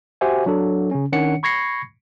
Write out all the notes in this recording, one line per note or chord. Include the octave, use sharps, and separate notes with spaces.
F#4 G4 C5 E5 F#5 G#5
F#3 D4 A4
C#3 C#4
D#3 C#4 D4 C#5 F#5 C#7
B5 C#6 G#6 A#6 C7 C#7